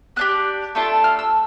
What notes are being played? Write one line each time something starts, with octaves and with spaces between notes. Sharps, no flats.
B3 D4 G4 F#6
A3 D4 F4 A4
F6
E6